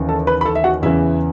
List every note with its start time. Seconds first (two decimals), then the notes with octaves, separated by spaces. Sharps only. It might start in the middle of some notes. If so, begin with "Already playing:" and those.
Already playing: D#2 C#3 E3
0.09 A4 A5
0.27 B4 B5
0.41 B5
0.45 A4 A5
0.55 E5
0.64 F#4 F#5
0.82 E2 C#3 E3 E4 E5